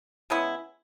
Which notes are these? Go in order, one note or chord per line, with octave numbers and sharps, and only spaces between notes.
C#3 G#3 B3 E4